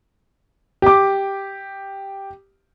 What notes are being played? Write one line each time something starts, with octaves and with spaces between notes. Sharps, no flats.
G4 D6